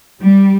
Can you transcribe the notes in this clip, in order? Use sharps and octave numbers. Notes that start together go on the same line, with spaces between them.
G3